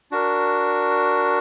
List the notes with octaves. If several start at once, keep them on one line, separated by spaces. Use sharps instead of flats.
D4 F#4 A#4